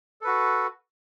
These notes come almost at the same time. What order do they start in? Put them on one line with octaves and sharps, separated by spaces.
A4 B4 F#4